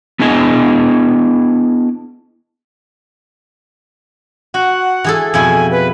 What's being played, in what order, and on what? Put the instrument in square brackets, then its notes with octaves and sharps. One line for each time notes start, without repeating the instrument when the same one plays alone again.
[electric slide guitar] B3 D4 E4 G#4 D#5 G#5
[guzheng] F#4 [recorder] F#5
[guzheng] E3 G#4 A4
[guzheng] F2 B2 E4 [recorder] G#5
[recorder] B4